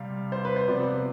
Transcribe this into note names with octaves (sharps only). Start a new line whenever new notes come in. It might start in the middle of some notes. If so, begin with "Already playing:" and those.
Already playing: C3 G3 C4 F5
C5
B4
C5
C3 F3 B3 D5